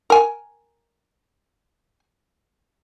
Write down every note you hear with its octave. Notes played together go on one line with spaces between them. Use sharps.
A#4 G#5